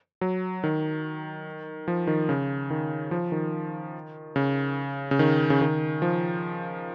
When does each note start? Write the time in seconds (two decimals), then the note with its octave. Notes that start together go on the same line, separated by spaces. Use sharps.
0.21 F#3
0.64 D#3
1.88 F3
2.07 D#3
2.29 C#3
2.70 D#3
3.11 F3
3.32 D#3
4.36 C#3
5.11 C#3
5.19 D#3
5.50 C#3
5.61 D#3
6.02 F3